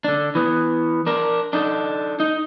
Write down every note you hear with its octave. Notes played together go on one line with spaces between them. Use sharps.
D3 D4
E3 B3
D4 A#4
D4 D#4 A4
D#4